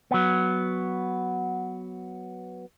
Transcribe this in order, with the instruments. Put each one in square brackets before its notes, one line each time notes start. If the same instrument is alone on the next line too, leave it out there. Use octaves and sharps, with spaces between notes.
[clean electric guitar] F#3 B3